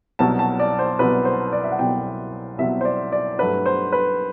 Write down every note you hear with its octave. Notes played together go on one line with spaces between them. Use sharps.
C2 B2 F#3 A5
A5
D5
C5
C2 B2 F#3 B4
C5
D5
E5
F#5
C2 B2 F#3 G5
C2 B2 F#3 E5
C5
D5
D5
G2 F#3 A3 D4 B4
C5
B4